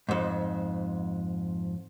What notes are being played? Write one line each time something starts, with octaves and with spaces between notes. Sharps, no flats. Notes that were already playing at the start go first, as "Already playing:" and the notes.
F2 G#2